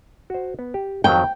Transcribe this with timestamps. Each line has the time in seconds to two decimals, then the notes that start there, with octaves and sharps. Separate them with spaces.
0.30 F#4 C5
0.59 B3
0.74 G4
1.04 F2 D#3 F#3 G5